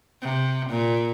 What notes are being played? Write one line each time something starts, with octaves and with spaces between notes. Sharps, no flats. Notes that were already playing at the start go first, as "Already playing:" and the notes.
C3
A#2